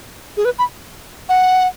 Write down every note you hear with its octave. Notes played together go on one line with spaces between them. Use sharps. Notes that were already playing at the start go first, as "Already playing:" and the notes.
G#4
B4
B5
F#5